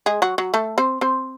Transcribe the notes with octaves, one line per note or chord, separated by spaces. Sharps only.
G#3 G#4
F#3 F#4
F#3 F#4
A3 A4
C4 C5
C4 C5